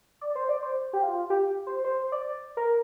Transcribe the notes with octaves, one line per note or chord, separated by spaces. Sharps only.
D5
C5
D5
C5
G4
F4
G4
C5
C5
D5
A#4